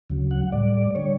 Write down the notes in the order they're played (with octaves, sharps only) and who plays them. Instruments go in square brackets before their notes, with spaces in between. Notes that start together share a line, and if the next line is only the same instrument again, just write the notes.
[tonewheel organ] D2 C#3 F#3
F#5
A2 G3 D5
D3 G3 C#5